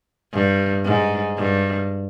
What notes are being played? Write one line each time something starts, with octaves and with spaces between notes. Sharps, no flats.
G2
G#2
G2